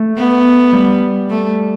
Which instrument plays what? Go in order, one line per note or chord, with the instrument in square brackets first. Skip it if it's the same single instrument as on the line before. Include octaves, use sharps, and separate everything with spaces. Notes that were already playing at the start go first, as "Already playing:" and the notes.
Already playing: [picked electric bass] A3
[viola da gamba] B3
[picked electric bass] G3
[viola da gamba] A3